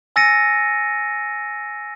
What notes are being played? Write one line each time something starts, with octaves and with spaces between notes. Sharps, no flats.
G#5 E6 A6 A#6 C#7 D#7